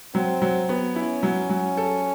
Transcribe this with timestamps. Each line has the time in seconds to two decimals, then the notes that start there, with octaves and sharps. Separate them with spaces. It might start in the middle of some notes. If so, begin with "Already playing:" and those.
0.15 F#3 C4
0.42 F#3
0.69 B3
0.96 C#4 E4
1.23 F#3
1.49 F#3
1.77 A4